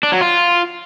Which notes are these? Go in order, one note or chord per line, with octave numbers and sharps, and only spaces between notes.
D4
F#3
F4